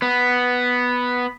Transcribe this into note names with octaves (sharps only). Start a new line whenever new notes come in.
B3